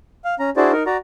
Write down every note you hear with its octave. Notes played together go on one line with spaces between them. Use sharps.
F5
C#4 A#5
D4 E4 F#4 G#4 C5 D5
D#4 A#4
F#4 D5 A#5